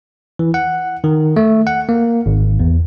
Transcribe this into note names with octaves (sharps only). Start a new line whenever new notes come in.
E3
F#5
D#3
A3
F#5
A#3
G#1
E2